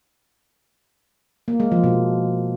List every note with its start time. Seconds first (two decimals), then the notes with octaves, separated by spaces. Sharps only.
1.48 A#3
1.60 G#3
1.72 F3
1.84 B2